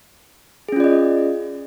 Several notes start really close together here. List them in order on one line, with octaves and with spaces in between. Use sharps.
G#4 C#4 F4 D5 D#5